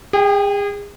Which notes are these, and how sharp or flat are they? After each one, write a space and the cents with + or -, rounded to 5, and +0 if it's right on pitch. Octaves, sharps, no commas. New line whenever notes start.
G#4 -35 G5 +5